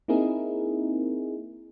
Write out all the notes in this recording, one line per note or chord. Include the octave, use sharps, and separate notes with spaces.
A#3 C4 D#4 E4 G#4 A#4